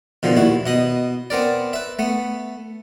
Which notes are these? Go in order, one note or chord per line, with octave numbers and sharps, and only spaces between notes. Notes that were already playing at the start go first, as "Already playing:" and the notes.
B2 D3 D#3 F3
D#2 A#2 E4 F#4
B2 D#5 B5
B3 C4 A#4 D5
B4 E5
A3 B3